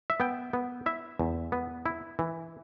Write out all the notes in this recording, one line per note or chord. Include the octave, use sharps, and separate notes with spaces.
E5
B3 G5
B3
E4 E5
E2
B3
E4
E3